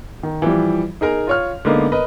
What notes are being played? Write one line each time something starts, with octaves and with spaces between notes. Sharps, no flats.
D#3
E3 F3 G3
D#4 G#4 A#4 A#5
F4 C#5 F6
D3 G#3 A#3 B3 D#4
A#4 B4 D#5